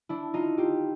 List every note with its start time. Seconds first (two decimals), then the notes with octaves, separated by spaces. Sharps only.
0.09 D4 E4
0.34 D#4 F4
0.58 F4 G4